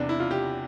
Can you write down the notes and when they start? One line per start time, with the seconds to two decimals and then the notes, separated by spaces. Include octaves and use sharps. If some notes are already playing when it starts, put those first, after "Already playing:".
Already playing: E2 C3 E3 D4
0.09 E4
0.20 F4
0.31 G4